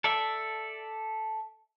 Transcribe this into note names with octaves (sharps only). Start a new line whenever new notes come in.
A4 D5 E5